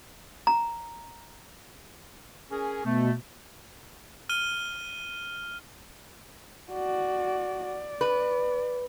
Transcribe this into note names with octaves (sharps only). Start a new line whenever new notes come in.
A#5
C#4 G#4 A#4
B2 A3
F6 D#7 G7
F#4 D5
D5
B4